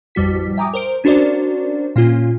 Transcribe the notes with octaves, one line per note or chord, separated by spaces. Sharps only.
A1 F2 G3 F#4 B6
E5 G5 G#5 A#5 D6 D#6
A#4 C5 D7
C#4 D4 F#4 A#4 C5 D5
A#2 A#3 C#4 F4